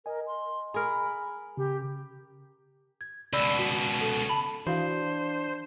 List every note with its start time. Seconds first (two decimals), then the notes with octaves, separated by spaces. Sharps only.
0.06 A#4 D#5 G#5
0.27 C6
0.74 G#4 A#4 B5
1.57 C#3 G4
3.01 G#6
3.33 C#2 B2 D5 B5 E6
3.59 F#4 B6
4.01 A4
4.29 A5 B5 F#7
4.67 E3 D4 F#4 C5 F5